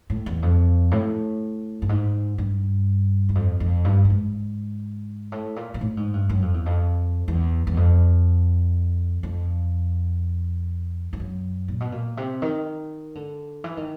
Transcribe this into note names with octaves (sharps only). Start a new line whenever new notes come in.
A2
E2
F2
A2
G2
G#2
G2
E2
F2
F2
G2
G2
G#2
A2
A#2
A#2
A2
G#2
G2
F#2
F2
E2
F2
E2
E2
F2
F2
F2
F#2
A#2
B2
A#2
C3
D#3
D3
E3
D#3